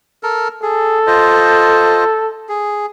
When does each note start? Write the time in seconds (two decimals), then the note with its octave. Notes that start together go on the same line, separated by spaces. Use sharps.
0.23 A4 A#4
0.63 G#4 A4
1.07 F4 C5 D#5
2.49 G#4